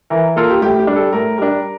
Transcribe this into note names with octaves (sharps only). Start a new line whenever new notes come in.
E3 A#4
A#3 F4 A4 A#4
G4
A2 G4
G4
G3 D4
A4
A2 A#4
G3 D4 A#4